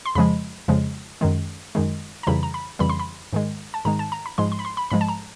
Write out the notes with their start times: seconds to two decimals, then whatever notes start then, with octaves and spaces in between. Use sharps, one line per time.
0.06 C6
0.15 F2 C#3 F3 G#3 B5
0.68 F2 C#3 F3 G#3
1.21 F#2 D#3 G#3
1.75 F#2 D#3 G#3
2.23 A#5
2.27 F2 C#3 E3 G3 B5
2.43 A#5
2.54 B5
2.79 F2 C#3 E3 G3 B5
2.89 C6
2.99 B5
3.33 G#2 D#3 G#3
3.74 A5
3.85 G#2 D#3 G#3 A#5
3.99 A5
4.12 A#5
4.26 B5
4.38 G#2 F3 G#3 C6
4.52 C6
4.59 B5
4.65 C6
4.77 B5
4.90 G#2 F3 G#3 B5
5.01 A5
5.09 A#5